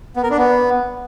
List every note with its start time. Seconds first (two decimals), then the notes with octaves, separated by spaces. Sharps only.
0.16 B3
0.23 A#4
0.30 D4
0.37 B3